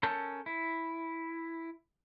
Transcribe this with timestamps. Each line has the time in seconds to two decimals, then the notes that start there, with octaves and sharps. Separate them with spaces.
0.03 C#4 A4 A#4 A5 G6
0.46 E4